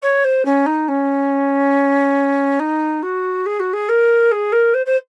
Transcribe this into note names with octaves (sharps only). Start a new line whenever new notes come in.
C#5
C5
C#4
D#4
C#4
D#4
F#4
G#4
F#4
G#4
A#4
G#4
A#4
C5
C5